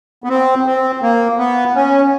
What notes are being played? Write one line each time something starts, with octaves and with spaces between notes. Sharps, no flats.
B3
C4
C4
A#3
B3
C#4